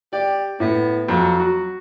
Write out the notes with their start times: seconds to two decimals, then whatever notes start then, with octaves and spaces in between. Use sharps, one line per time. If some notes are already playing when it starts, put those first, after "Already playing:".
0.13 G4 D5
0.60 A2 B3
1.09 F2 F#3
1.39 F#4